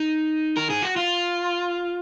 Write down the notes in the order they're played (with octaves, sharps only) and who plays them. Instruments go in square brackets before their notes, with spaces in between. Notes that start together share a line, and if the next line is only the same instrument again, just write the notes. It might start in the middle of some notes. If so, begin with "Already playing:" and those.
Already playing: [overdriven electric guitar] D#4
A#4
G#4
F#4
F4